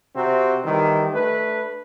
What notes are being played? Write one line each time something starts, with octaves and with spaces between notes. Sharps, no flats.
C3 C4 F#4
D#3 E3 G3
A3 D4 B4